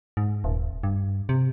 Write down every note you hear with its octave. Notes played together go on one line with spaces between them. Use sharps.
G#2
D#1
G2
C3